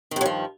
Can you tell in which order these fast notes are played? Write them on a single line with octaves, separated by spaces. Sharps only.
D#3 G2 F#3 F3